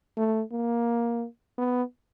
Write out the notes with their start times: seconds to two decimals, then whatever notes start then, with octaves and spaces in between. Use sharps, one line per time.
0.17 A3
0.52 A#3
1.58 B3